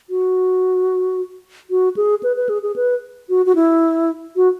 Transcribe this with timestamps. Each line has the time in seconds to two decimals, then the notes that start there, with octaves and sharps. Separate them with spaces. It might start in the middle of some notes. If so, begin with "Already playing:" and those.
0.10 F#4
1.70 F#4
1.97 G#4
2.23 B4
2.37 B4
2.49 G#4
2.63 G#4
2.76 B4
3.29 F#4
3.46 F#4
3.55 E4
4.36 F#4